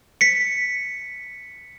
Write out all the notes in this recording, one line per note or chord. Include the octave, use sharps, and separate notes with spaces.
B6 C#7